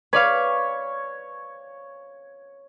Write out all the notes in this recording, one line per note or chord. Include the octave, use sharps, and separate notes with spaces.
B4 C#5 D5 F5